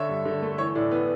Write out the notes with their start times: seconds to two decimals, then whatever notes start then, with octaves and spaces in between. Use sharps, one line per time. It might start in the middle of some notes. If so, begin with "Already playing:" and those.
Already playing: D3 C#5 E5
0.09 G2
0.25 D3
0.42 A3
0.58 E3 C#5
0.75 A2 D5
0.91 B3